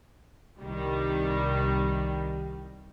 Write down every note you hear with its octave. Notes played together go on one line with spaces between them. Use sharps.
C2 D#3 G3